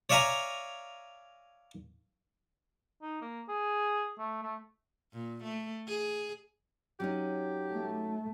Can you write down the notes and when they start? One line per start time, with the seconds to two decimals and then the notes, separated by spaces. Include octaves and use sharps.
0.10 C#5 D5 E5 F5 G#5 A#5
3.02 D#4
3.22 A#3
3.49 G#4
4.19 A3
4.43 A3
5.13 A#2
5.43 A3
5.87 G#4
7.00 F#3 C#4 D#4 G4
7.72 A3